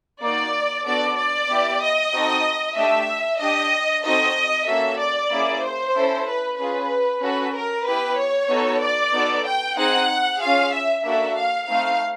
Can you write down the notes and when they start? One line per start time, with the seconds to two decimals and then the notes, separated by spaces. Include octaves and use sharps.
0.21 A#3 D#4 F#4 D5
0.85 B3 D4 F#4 A4 D5
1.17 D5
1.49 B3 E4 G4
1.82 D#5
2.13 C4 D#4 F#4 A4
2.76 A3 D4 G4 E5
3.39 D4 G4 D#5
4.03 C4 D#4 F#4 A4 D#5
4.67 A#3 C#4 F#4 A4 E5
4.99 D5
5.31 A#3 C#4 E4 G#4
5.63 C5
5.94 C#4 E4 A4
6.27 B4
6.58 C#4 F4 G#4 B4
7.21 C#4 F#4 A4 B4
7.53 A#4
7.85 B3 E4 G4 B4
8.18 C#5
8.50 B3 D#4 F#4 A4
8.82 D5
9.12 B3 D#4 F#4 A4
9.45 G5
9.76 C4 D#4 G#4 F#5
10.40 C#4 F4 G#4 F5
10.72 E5
11.04 A#3 D4 F#4 A4 E5
11.36 F5
11.67 A3 C4 D#4 F5